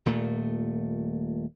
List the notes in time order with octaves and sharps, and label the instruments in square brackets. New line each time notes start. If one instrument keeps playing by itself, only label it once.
[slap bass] D#1 A#2 A3